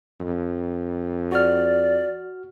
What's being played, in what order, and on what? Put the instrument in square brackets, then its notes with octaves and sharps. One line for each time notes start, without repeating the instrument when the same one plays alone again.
[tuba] F2
[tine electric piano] F#4 F6 [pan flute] D5